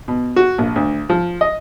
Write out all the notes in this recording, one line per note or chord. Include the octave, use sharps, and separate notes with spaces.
B2
F#4
A#1
D2
F3
D#5